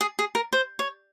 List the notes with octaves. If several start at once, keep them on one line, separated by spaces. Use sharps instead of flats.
G#4
G#4
A#4
C5
C#5